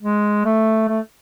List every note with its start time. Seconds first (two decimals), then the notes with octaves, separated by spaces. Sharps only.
0.01 G#3
0.45 A3
0.88 A3